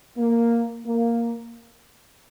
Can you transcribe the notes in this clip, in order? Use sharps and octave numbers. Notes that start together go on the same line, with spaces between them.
A#3
A#3